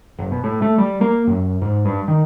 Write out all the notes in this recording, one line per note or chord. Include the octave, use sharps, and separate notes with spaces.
F#1
B2
A2
A3
G3
A#3
F#2
G#2
G2
D#3